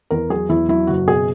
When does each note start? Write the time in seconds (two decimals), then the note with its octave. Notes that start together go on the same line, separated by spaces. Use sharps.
0.10 E2 A#4
0.30 F#3 G#4
0.49 E2 E4
0.68 F#3 E4
0.87 F#1 F#4
1.07 B2 G#4